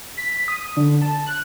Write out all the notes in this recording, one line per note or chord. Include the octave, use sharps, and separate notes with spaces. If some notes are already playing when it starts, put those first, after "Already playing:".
B6
D#6
D3
A5
F#6